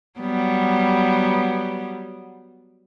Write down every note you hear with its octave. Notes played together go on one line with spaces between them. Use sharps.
F#3 G3 B3